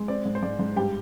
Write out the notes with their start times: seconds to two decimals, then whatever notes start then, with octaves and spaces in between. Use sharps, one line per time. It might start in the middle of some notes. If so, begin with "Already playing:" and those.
Already playing: G#3
0.08 C4 D5
0.25 G#2
0.35 C5
0.43 G#2 D5
0.59 G#2
0.76 G2 G4 G5